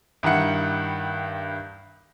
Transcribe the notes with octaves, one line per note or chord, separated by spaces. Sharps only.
G2 D#3 E4 F#5 C#7